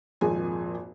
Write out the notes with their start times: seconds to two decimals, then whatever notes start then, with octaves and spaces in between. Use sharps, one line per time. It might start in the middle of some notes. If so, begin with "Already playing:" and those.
0.21 G#1 F2 A#2 G#4 G#5